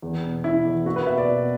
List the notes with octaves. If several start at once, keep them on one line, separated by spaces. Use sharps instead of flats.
E2
B2
B2 E4
E2
A#3 F#4
B4
B2 E5
D5
B2